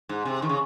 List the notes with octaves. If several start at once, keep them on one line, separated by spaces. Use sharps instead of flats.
G#2
C3
D#3
C#3